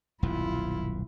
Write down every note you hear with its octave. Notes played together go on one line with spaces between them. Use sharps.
D#1 B1 F#2 E4 F4